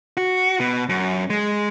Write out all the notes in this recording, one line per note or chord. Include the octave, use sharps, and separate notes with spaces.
F#4
B2
F#2
G#3